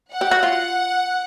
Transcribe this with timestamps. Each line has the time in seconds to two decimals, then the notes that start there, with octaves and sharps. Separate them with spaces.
0.11 F#5
0.21 G4
0.31 F#4
0.43 F4